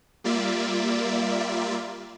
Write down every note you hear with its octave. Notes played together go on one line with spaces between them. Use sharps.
G3 A#3 F4 D5 E5